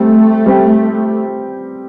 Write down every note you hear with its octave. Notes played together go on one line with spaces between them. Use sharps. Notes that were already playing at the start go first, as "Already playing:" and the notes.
Already playing: G3 A3 C4 G4
G3 C4 G4